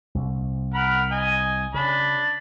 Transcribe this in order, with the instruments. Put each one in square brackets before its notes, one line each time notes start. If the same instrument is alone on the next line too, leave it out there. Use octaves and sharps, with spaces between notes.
[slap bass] C2
[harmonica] A#4 F#5 B5
D#5 G#5
[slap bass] C#3 [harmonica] D4 B5